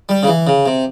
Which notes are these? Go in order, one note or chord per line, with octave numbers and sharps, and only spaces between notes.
G3
C#3
E3
C#3
C3